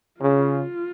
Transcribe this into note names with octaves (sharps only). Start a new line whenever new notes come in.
C#3 F4